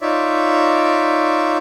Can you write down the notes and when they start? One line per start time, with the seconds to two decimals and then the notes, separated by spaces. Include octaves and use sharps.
0.01 D#4 F4 C#5 D5 E5